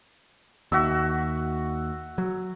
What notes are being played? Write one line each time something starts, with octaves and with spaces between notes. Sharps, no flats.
D#2 F#4 E5 E6
F#3